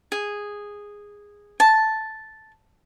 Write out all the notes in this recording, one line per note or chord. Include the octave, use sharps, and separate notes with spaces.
G#4
A5